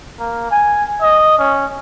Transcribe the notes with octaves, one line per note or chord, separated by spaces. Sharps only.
A#3
G#5
D#5
C#4